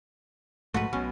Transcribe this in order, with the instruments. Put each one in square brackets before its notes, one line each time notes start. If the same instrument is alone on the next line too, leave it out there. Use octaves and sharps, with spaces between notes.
[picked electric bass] A#1 G#2 A3 [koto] F#4 B4
[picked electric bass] B1 B2 [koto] C#4